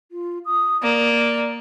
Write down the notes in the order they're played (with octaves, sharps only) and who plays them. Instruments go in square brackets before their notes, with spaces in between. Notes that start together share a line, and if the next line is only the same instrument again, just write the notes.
[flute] F4
D#6
[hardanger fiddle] A#3 [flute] D5